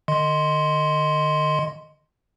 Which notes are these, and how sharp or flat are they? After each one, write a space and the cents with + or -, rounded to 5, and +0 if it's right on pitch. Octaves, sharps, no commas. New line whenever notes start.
D3 +45 D#5 +0 C6 +0